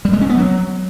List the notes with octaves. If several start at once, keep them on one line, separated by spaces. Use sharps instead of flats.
G3
G#3
C#4
B3
F#3